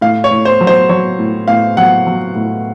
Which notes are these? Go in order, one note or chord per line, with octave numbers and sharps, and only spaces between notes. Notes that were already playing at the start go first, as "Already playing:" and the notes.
A2 F5
C#5
A2
C5
F#3
C5
F#3 C#5
A2
A2 F5
F#3 F#5
F#3
A2